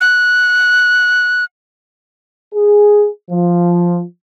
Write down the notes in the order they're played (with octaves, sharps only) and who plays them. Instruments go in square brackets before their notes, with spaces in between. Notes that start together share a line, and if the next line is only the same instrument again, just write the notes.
[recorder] F#6
[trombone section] G#4
F3